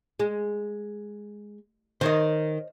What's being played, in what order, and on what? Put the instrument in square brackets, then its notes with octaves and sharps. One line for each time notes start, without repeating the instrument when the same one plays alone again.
[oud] G#3
[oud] D#3 [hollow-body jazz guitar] C5 C#5 D#5